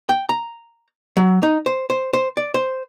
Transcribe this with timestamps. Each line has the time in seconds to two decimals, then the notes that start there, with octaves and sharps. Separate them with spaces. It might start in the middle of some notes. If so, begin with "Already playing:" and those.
0.09 G5
0.29 A#5
1.17 F#3
1.43 D#4
1.66 C5
1.90 C5
2.13 C5
2.37 D5
2.54 C5